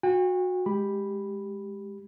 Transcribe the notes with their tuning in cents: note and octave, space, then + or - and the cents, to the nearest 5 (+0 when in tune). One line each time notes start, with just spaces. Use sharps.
F#4 -20 G5 +40
G#3 +0 G4 +0 B5 +0